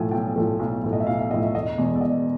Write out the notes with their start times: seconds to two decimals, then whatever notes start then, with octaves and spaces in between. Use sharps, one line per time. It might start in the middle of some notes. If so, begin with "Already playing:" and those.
Already playing: B1 A2 F3 A3 G5 G#5
0.11 B1 G5
0.36 A2 F3 A3
0.59 B1
0.84 A2 F3 A3
0.93 D#5
1.00 E5
1.07 B1 F5
1.19 E5
1.31 A2 F3 A3 D#5
1.43 E5
1.55 E1 D#5
1.78 E2 B2 G#3
1.96 D5
2.01 E1 D#5